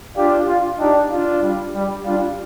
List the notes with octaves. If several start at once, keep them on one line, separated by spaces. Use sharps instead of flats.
D4 F4 G4
F4
D4 D#4 G4
D4 F4
G3
G3
G3 D4 F4